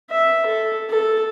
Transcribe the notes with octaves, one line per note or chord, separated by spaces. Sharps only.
E5
A4
A4